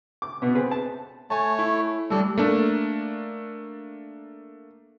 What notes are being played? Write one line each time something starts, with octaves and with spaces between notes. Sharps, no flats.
D6
B2 B3
C4 G#4 B4
A5
A3 C#5 G#5 A5
E4
G3 A3 D4 A4
A3 A#3 D4